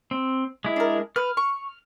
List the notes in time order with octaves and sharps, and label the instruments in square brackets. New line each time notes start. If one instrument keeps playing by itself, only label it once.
[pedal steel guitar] C4
G#3 E4
[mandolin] D4 A#4
[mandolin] B4 [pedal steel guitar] F6
[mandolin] C#6